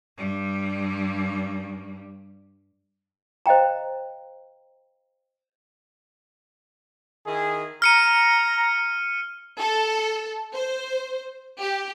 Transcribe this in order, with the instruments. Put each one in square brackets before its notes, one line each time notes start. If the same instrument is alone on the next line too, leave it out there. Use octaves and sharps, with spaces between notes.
[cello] G2 G3
[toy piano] C5 D#5 F5 G5 A#5
[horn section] D#3 E4 G#4
[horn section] A#5 [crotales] F6 C#7 D#7
[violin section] A4
C5
G4